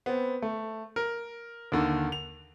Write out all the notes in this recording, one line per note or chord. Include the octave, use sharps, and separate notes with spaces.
B3 C4
A3
A#4
D#2 D3 D#3
F7